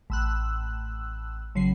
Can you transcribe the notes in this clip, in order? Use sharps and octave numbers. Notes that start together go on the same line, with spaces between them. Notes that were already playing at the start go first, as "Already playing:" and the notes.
A1 E6 F#6
A1 C#3 F#3 C7